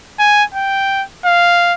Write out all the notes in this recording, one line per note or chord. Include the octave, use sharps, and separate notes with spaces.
G#5
G5
F5